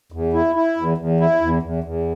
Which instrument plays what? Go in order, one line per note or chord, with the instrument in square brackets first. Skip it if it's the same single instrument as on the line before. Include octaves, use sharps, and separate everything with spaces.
[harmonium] E2
E4
E4
E2
E2
E4
E2
E2
E2